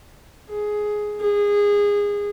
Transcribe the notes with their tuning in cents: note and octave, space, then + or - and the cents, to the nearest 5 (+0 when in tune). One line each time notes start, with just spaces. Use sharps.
G#4 +10
G#4 -20